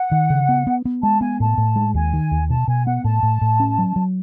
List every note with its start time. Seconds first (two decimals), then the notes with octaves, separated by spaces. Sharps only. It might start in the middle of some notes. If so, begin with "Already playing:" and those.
Already playing: F#5
0.12 D#3
0.30 C#3
0.49 B3
0.67 B3
0.85 B3
1.03 G#3 A5
1.21 B3 G#5
1.40 A2 A5
1.58 A2
1.76 G#3
1.94 D#2 G#5
2.13 D#3
2.31 D#2
2.49 B2 A5
2.68 B2 G#5
2.86 B3 F#5
3.04 A2 A5
3.23 A2
3.41 A2
3.60 C#4
3.78 F#3
3.96 F#3